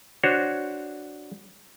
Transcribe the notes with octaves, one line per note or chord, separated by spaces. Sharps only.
D4 F#4 C5 C#5